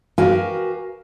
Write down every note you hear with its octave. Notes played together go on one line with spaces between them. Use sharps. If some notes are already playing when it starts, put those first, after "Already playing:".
F#4 G4 A#4 B4 F5 G#5